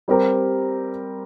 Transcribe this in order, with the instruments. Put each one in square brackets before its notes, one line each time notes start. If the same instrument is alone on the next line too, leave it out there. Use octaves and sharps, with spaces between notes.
[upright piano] G3 C4 G4 A#4